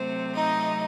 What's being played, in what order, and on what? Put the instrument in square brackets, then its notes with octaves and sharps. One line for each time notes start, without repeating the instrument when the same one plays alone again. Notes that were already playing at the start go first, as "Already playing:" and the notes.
Already playing: [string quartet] C3 F#3 A3 C4 C5
D#4 D#5